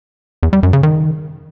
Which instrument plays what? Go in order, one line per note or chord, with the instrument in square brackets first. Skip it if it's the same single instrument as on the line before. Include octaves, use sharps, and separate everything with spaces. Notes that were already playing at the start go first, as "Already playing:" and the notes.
[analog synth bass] E2
G3
F#2
C#3
D#3